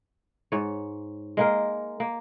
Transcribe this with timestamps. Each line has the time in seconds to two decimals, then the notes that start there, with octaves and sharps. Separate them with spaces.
0.52 G#2 C#5
1.37 G#3 A#3 A#4
2.00 A#3